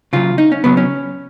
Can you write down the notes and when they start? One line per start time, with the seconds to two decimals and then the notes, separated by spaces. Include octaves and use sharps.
0.13 C#3 F#3 F4
0.38 D#4
0.52 C#4
0.64 C#3 F#3 B3
0.77 C#4